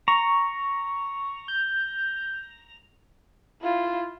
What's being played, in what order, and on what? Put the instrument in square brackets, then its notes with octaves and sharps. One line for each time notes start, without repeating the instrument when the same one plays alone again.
[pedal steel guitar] A#5 [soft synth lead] C#6
[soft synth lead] G6
[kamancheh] E4 F4